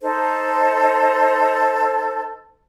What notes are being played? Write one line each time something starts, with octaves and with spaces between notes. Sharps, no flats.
D#4 A4 C5